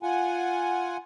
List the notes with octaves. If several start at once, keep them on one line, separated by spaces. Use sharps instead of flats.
F4 F#5 G#5